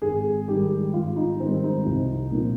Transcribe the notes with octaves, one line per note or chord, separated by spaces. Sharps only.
G#1 G#4
G#2 D#3 G3 G4
G#1 F4
D#4
G#2 D#3 G3 C4
D#4
C2
A#2 F3